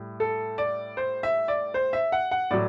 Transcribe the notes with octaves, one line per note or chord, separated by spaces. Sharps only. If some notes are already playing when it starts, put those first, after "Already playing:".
Already playing: A2 G3
A4
D5
C5
E5
D5
C5
E5
F#5
F#5
A2 F#3 D5